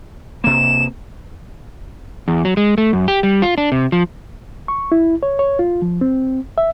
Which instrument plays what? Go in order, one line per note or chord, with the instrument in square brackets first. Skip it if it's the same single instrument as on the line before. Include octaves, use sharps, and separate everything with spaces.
[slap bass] C3 A#3 [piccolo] E7
[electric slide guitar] E2
F#3
G#3
A3
F#2
G4
G3
F4
D4
C3
F3
[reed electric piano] C#6
E4
C#5
C#5
F4
F3
C4
E5